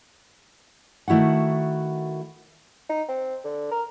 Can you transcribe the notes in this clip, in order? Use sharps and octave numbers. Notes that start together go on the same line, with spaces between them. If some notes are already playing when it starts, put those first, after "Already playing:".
D#3 A3 E4 F#4 F#5
D#4
C4
D3
A#4